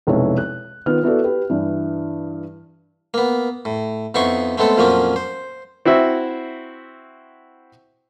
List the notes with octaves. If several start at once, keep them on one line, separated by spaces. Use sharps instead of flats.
F1 B1 G#3 E4 B4 C#5
F#6
D#3 B3 F4 F6
B3 E4 F#4 A4 D5
G4 B4
G2 E3
A#3 B3
A2
F2 B3 D#4 E4 C6 C#6
G#3 A3 B3 C4 A4
F2 A#2 F3 F#3 A#3 C#4
C5
C4 E4 F#4 E5